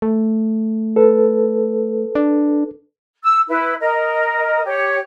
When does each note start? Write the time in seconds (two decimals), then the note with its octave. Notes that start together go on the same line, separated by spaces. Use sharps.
0.02 A3
0.96 A4 B4
2.15 D4
3.22 E6
3.49 E4 B4
3.80 A#4 D#5
4.65 G4 C#5